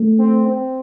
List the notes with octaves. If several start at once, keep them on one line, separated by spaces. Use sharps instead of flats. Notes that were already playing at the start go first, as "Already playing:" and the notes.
Already playing: A3
C4
C4